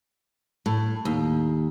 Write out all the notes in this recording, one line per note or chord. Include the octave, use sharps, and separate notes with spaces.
A2
D#2